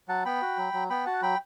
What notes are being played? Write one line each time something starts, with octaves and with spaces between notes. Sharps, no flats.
F#3 F#5 A5
B3 G5 B5
F#4
F#3
F#3
B3 G5 B5
F#4 F#5 A5
F#3 G5 B5